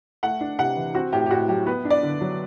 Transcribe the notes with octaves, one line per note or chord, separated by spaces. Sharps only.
A3 F#5
D4
C3 F#5
E3
C4 F#4
A2 G4
G4
A2 F#4
F#3 G4
B3 B4
D4
D5
D3
F#3